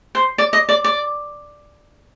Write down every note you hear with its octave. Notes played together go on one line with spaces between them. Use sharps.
C5
D5
D#5
D5
D5